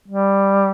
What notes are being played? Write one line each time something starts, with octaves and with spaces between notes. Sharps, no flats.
G3